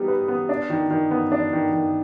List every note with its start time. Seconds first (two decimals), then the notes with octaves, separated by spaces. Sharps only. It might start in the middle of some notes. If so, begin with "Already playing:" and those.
Already playing: G3 B3 D#4
0.08 B4
0.28 B3
0.49 D4
0.70 D#3
0.90 D#3
1.11 B3
1.32 D4
1.53 D#3
1.73 D#3